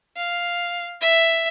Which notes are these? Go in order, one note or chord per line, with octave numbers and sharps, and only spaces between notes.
F5
E5